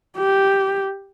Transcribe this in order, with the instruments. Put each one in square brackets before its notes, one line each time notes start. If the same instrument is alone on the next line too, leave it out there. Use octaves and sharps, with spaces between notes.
[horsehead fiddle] G4